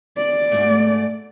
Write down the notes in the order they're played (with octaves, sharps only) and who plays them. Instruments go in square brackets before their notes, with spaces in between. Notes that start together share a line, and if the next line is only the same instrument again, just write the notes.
[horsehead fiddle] D5
[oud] G#2 A3